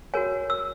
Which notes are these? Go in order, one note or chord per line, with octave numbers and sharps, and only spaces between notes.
F#4 A#4 C#5 G#5
E6